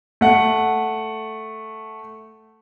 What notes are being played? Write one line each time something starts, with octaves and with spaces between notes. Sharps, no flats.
A3 F#5